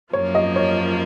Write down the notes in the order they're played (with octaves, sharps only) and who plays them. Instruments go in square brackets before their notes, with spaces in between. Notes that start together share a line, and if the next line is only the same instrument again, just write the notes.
[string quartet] F#2 F3 A#3 F4 [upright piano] C#5
[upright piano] D#5
C#5